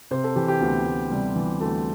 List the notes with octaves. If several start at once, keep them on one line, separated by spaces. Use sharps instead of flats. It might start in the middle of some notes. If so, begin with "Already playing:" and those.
C3 C5
A4
E3 G4
G4
D2 B3
D2
C3 G3
E3
D2 A3